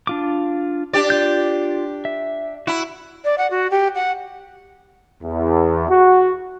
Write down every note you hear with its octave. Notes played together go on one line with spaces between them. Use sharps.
D4 F4 D6
D4 G4 D5
F4 G6
E5
E4 F#4 B5
D5
F#5
F#4
G4
F#5
E2
F#4